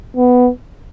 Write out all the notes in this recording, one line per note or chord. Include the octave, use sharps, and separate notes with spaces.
B3